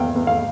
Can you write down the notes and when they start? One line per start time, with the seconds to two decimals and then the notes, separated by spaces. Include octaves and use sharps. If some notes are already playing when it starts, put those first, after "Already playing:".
Already playing: E2 F5 G5
0.16 E2
0.27 F5